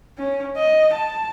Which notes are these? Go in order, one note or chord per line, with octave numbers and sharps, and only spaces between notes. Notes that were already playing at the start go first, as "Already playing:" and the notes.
C#4
D#5
A5